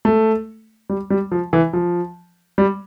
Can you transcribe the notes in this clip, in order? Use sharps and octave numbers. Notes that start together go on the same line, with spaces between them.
A3
G3
G3
F3
E3
F3
G3